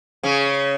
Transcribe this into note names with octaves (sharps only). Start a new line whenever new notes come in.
C#3 C#4